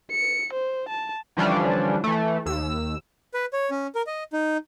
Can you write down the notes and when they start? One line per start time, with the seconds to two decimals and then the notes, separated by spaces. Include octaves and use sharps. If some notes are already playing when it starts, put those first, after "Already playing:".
0.12 C#7
0.53 C5
0.89 A5
1.37 D3 E3 F3 G3 C#4 D4
2.04 E3 A3
2.46 D#2 E6
3.34 B4
3.53 C#5
3.71 C#4
3.95 A#4
4.07 D#5
4.33 D#4